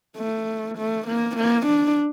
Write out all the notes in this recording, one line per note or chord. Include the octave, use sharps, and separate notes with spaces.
A3
A3
A#3
A#3
D4